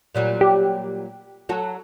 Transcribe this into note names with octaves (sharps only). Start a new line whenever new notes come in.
A#2 F#3 G3
G4
F#3 F#4 A4